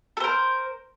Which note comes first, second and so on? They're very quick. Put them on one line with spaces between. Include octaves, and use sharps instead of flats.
A4 C5 A#4